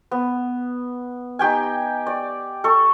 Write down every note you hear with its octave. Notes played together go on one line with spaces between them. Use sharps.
B3
D#4 G4 G5 G#5
D5
A4 C#6